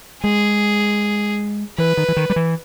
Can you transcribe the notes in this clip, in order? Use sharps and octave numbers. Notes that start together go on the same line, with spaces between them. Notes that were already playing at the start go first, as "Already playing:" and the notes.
G#3 G#4
E3 B4
D#3
E3
D#3
G3
E3